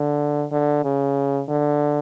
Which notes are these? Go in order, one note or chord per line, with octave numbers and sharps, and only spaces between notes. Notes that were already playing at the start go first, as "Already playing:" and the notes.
Already playing: D3
D3
C#3
D3